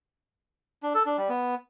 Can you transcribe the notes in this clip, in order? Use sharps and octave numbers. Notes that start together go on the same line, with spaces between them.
D4
A4
D4
G3
B3